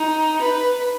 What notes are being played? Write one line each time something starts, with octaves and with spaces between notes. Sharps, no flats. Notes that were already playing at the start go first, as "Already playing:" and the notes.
Already playing: D#4
B4